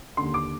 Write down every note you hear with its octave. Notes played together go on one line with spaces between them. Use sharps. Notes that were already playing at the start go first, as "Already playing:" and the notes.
D#2 D3 C6
D6